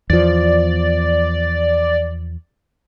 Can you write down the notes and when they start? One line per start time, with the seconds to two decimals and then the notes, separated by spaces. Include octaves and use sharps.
0.10 E2 F3 D5